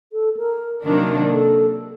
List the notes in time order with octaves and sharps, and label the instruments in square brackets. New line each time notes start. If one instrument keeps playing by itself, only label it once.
[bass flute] A4
A#4
[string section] C3 D#3 F#3 A#3 D4 [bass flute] A#4
[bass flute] A4